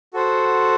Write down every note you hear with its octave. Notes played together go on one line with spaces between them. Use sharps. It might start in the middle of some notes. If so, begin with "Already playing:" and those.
F#4 A4 C5 F#5